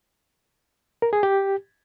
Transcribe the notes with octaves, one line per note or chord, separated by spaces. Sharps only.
A#4
G#4
G4